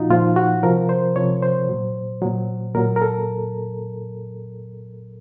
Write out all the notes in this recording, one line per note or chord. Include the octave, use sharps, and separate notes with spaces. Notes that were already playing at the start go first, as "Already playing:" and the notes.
Already playing: A#2 F3 D#4 F4 F#4
A#2 F3 F4
F#4
C3 F3 A#4
C5
C3 F3 C#5
C5
A#2 F#3
A#2 F#3
A#2 F#3 A#4
A#4
A4